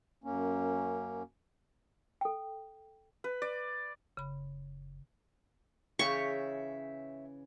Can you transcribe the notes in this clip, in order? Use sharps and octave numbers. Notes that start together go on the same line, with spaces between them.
F#2 A#3 C#4
A4 G5
B4
D5
F#1 C#3 B5
C#3 E3 C#5 E5 G5 C#6